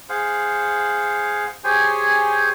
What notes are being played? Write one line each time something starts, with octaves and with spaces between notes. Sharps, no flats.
G#4 C5 F5 F#5
G4 G#4 C5 C#5 G5 G#5